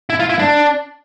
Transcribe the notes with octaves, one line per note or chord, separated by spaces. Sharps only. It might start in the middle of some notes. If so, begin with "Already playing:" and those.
E4
F4
E4
D4